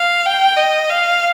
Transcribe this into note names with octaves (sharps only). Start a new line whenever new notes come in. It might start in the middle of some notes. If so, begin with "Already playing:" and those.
Already playing: F5
G5
D#5
F5